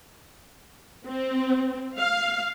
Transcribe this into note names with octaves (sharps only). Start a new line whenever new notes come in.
C4
F5